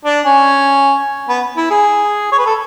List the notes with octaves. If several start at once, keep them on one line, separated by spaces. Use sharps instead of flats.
D4
C#4
B3
E4
G#4
C#5
B4
A4